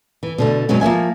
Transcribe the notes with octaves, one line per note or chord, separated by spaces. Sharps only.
E3
B2 D3 A3
E2 B2 D3 F#3 G#3 C#4
F3 A#3 E5 G#5